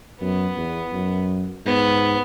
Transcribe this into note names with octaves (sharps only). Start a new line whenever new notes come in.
F#2 B3
E2
F#2
G#2 B3